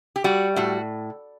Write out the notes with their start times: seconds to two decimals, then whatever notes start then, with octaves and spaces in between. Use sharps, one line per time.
0.16 G4
0.24 G3 F#4
0.56 A2 F#4